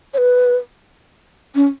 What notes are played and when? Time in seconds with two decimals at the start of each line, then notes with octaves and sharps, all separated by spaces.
0.14 C#5
0.18 B4
1.55 C#4